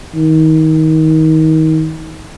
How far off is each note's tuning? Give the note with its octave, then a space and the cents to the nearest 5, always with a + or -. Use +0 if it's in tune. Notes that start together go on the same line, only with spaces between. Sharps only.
D#3 +25